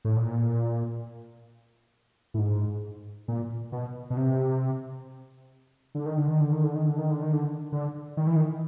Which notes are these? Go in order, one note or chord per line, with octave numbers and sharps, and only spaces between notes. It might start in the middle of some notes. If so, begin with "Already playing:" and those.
A2
A#2
A2
G#2
A#2
B2
B2
C3
D3
D#3
D3
D#3
D3
D#3
D3
D#3
D3
D#3
D3
D#3
D3
D3
D#3
E3
D#3